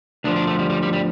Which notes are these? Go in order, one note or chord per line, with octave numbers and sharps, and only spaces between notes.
D2 D3 F3 D4
D4
A3
G3
G3
G3
G3